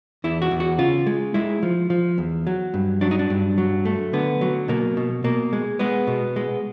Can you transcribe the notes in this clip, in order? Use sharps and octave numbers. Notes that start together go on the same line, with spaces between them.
E2 E4
F#4
E2
F#4
C#3 F4
G#3
G#3 E4
F3
F3
E2
F#3
G2
F#3 D4
D#4
D4
G2
F#3
A3
D3 B3
F#3
B2 A#3
B2
B2 A#3
G#3
G#3 B3
B2
G#3